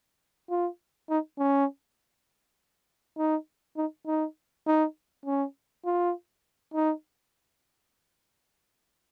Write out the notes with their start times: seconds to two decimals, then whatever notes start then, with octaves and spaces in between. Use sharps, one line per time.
0.50 F4
1.10 D#4
1.38 C#4
3.18 D#4
3.77 D#4
4.07 D#4
4.66 D#4
5.26 C#4
5.85 F4
6.74 D#4